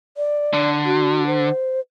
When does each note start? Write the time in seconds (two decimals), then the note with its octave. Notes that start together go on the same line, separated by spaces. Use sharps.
0.17 D5
0.54 D3
0.85 F#4
1.27 C5